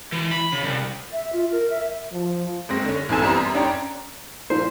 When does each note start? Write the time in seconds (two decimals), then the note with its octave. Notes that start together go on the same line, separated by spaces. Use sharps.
0.12 E3
0.31 B5
0.52 C#3
0.64 C2
1.13 E5
1.33 F4
1.52 A#4
1.70 E5
2.12 F3
2.69 F#1 G#3 C4 A#6
2.85 D3 C#4
3.09 B1 E3 C4 A4 G#5 E7
3.22 F#2 G3 B3 C4 A#5 C6
3.55 C#4 D4 G5 A#5
4.50 A#2 F3 C5